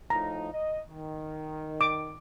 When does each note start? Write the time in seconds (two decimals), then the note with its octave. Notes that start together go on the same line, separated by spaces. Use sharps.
0.10 A2 F3 D#4 A#5
0.51 D#5
0.89 D#3
1.81 D6